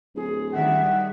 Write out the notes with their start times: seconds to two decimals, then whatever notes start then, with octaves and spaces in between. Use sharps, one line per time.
0.15 D1 G#4
0.53 D#3 G3 E5 F#5